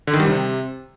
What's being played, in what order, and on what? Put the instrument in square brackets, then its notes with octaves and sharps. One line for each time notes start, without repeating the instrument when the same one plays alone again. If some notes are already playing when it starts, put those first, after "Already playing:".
[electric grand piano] D3
D#3
G3
C3